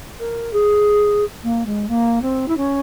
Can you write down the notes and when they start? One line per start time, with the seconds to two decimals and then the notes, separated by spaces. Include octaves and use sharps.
0.19 A#4
0.53 G#4
1.43 A#3
1.66 G#3
1.88 A#3
2.21 C4
2.48 E4
2.56 C#4